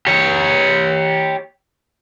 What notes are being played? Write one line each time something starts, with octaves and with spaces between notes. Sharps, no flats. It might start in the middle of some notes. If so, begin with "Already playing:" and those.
G4 C#5